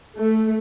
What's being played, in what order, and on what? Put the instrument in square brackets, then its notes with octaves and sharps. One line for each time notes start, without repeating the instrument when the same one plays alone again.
[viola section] A3